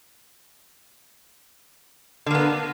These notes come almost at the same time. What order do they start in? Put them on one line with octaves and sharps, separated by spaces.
D3 A#3 B3